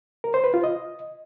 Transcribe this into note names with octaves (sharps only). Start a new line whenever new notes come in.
A#4
C5
B4
F4
D#5